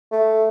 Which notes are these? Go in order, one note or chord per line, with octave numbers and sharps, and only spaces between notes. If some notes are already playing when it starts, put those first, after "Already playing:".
A3